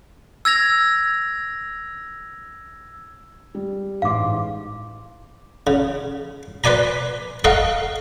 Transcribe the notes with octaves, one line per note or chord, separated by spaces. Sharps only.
E6 G#6 A#6 F7
G3
A1 G#2 F5 C6 D6
C#3
B4 C5 D5 G#5 A#5
A4 D#5 F5 F#5 A#5 C#6